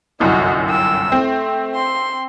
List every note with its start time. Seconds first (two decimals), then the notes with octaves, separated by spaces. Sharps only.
0.20 G1 C2 F#2 F#4 D#5
0.66 G5 E6
1.12 A3 C4
1.75 C6